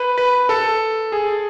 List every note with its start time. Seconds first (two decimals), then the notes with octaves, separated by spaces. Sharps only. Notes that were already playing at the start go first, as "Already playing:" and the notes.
Already playing: B4
0.18 B4
0.49 A4
1.12 G#4